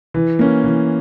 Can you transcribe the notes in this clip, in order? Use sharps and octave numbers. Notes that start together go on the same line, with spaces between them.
E3
A#3 C#4
E3